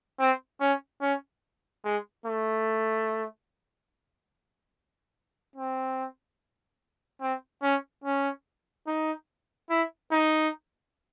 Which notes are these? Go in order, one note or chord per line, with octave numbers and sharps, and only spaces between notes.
C4
C#4
C#4
G#3
A3
C4
C4
C#4
C#4
D#4
E4
D#4